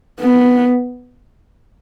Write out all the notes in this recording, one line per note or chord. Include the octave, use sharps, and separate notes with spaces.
B3